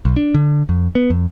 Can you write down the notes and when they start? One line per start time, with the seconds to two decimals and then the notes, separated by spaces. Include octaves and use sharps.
0.05 B1
0.16 D4
0.34 D3
0.69 F2
0.95 B3
1.10 F2